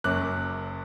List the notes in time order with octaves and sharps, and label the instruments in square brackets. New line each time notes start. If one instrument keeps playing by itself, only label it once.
[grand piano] F#1 F#2 F#3 D6 F#6